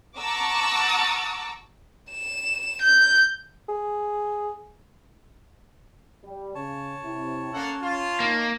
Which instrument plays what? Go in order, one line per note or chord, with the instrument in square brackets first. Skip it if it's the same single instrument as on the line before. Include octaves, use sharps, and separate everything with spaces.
[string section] F#5 A5 A#5 C#6 D6 E6
[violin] E7
G6
[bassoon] G#4
[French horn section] G3
[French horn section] C#3 [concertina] C#5 A5
[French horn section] C3 E4
[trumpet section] A#3 A4 F#5 [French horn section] C#4
[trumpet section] F4
[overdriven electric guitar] A#3 [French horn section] D#4